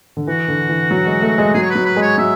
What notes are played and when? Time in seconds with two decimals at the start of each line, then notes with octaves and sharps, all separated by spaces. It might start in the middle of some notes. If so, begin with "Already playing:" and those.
0.17 D3
0.27 E3 F#4
0.48 D3
0.69 E3
0.91 F#3
1.07 G#3
1.22 A3
1.38 G#3
1.54 F#3 G#4
1.62 C#5
1.70 B4
1.75 F#3
1.85 B4
1.96 G#3
2.02 C#5
2.18 F#3 E5